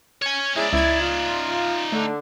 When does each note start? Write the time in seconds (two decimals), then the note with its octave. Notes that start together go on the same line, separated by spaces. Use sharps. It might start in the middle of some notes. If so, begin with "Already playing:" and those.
0.22 C#5 G#5
0.56 G#3 C#4 D#4 E4 D5
0.73 C#2 E4 G#6
1.01 F4
1.92 D3 A3